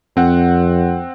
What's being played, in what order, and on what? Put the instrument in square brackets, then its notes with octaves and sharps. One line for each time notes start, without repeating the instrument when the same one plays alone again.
[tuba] F2 [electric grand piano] C4 F#5